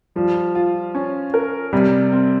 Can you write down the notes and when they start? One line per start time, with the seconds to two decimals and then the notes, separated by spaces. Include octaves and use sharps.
0.16 F3 G3
0.55 F4
0.95 C#4
1.34 A#4
1.73 C3 G3
2.12 C4